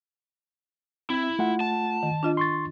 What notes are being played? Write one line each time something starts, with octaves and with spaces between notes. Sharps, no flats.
C4 E4
A3 F4 F#5
A5
D#3
D4 F4 D#5
C6 C#6 A6